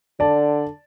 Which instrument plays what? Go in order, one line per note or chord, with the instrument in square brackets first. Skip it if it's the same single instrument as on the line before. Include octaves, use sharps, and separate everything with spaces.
[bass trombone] D3 [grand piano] D5 A5